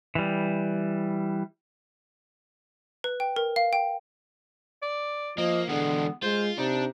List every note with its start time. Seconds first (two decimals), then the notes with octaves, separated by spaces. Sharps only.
0.15 E3 G3
3.04 B4
3.20 G5
3.36 A#4
3.56 F5
3.73 G5
4.83 D5
5.38 F3 A#3 D#5
5.69 D3 E3 G#3 B3
6.23 G#3 F4 C5
6.58 C3 D4 D#4